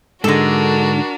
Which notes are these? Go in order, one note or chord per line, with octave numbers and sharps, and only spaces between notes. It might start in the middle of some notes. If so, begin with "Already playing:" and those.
G#2 D3 G#3 D4 F#4 A4 A#4